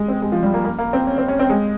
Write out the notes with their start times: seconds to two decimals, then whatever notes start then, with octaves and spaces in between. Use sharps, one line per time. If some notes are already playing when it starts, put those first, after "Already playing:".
Already playing: G#3
0.08 C4
0.22 G#3
0.32 F3
0.43 G3
0.54 A#3
0.65 A#3
0.79 A#3
0.93 C4
1.07 C#4
1.18 C4
1.28 C#4
1.39 C4
1.49 G#3